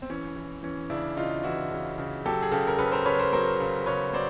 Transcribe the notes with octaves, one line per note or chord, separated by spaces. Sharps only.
C4
E3 C#4
E3
E3 C#4
C#3 D4 E4
C#3 D#4 F4
E3 E4 F#4
C#3
C#3
F#3 G4 A4
G#4
C#3 G4 A4
A#4
C#3 A4 B4
A#4 C5
C#3 B4 C#5
A#4 C5
F#3 A#4 C5
C#3
C#3 B4 C#5
F#3 C5 D5